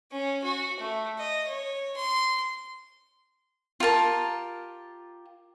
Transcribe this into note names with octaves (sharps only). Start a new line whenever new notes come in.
C#4
F#4
A3
D#5
C#5
C6
F4 G4 A#4 A5